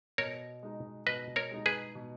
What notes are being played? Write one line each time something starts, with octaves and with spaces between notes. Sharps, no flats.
B2 A#4 C#5
G#3 D#4
B2 B4 D#5
A#4 C#5
G#3 D#4
G#4 B4
B2